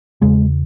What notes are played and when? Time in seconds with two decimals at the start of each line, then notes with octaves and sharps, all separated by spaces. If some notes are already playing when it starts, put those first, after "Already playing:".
0.21 E2 C#3 G#3